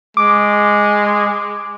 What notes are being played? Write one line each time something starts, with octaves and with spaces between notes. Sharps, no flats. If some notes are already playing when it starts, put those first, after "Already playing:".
G#3 D6